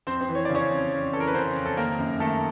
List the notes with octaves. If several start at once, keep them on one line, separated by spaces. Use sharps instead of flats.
F2 C4 C5
C4 C5
E3
C#5
C#3 D5
C#4 C#5
F2
F2
E3 A4
A#4
B4
C#3 C4 C5
F2
A4
D#3 A#3 A#4
F#2
D#3 A3 A4